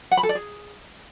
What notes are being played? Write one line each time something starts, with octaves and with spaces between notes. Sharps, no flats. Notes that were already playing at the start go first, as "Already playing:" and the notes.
F#5
B5
A4
D5
G#4